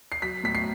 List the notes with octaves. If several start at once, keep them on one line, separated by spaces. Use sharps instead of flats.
C7
F#3 B6
A2 B6
C7